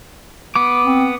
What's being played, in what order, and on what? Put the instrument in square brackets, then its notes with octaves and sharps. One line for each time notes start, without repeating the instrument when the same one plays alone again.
[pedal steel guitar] B3 D6
[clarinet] C4